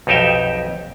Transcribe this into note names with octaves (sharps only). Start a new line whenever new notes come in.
B1 F2 D#4 G4 E5 G5